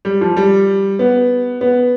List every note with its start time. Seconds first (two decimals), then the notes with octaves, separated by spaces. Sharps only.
0.05 G3
0.21 F3
0.37 G3
0.99 B3
1.61 B3